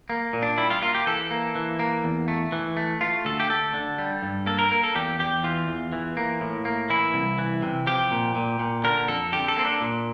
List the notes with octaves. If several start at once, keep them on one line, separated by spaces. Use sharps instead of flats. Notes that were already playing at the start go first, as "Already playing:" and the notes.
A#3
A#2
D4
G3 E4
F4
A#3 F4
G4
E3 A4
A#3
E3
A#3
E2
A3
E3
A3
A3 F4
D2 A4
G4
D2 A4
D3
G3
G2
A#3 A4
A#4
A#3 A#4
A4
E2 G4
E2 G4
E3 F4
E2
E3
A#3
A2
A#3
E3 E4
C2
E3
C3
F3 G4
A#2
A#2
A#2
D3 A#4
F2 A4
D3 G4
A4
A#3 C4
D4
A#2